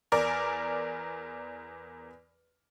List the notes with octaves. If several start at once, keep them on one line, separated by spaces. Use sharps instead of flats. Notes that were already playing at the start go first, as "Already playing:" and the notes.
E2 A#4 D5